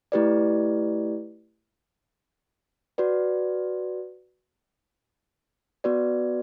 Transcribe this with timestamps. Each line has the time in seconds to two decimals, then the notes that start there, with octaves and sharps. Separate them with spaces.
0.12 A3 E4 G4 B4 D5
2.98 F#4 B4 D5
5.84 B3 F#4 B4 D5